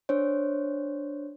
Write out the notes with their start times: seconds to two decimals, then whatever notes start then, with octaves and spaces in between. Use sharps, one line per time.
0.09 D4 C5 C#5